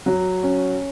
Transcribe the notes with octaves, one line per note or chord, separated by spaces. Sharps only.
F#3
C#4